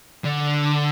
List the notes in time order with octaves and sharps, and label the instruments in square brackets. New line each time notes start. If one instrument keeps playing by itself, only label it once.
[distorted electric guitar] D3